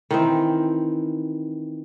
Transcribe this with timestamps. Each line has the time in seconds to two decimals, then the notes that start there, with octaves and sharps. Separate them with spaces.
0.11 D#3 E3 C4